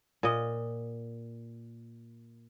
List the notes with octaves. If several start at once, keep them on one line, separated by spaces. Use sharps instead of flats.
A#2 D#5